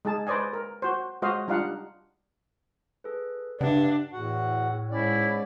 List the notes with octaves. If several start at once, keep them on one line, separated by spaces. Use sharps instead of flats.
G#3 D#4 G#4 A5
B4 C5 D5 D#5 G#5
A#4
F#4 C5
G#3 F#4 C5 D#5 F5
G3 D4 D#4 F4 F5 F#5
G#4 A4 B4
G2 C#3 D4 E5 F#5
E2 A2 F#4 F#5
G#2 C#4 E4 D5